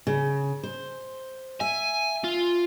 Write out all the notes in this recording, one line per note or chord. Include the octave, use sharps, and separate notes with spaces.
C#3
C5
E5 G#5
F4